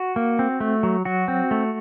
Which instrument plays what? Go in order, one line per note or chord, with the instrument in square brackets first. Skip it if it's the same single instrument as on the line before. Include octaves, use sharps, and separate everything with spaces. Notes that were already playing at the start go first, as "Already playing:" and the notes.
Already playing: [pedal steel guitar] F#4
A#3
C4
A3
F#3
F#3 F#4
C4
A3